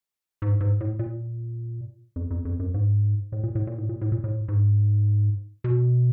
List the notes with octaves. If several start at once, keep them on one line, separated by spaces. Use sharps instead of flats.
G#2
G#2
A2
A#2
F2
F2
F2
F#2
G#2
A2
A#2
A2
A#2
A2
A#2
A2
A#2
A2
G#2
B2